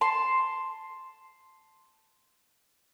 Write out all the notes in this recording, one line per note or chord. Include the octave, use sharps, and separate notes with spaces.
A5 C6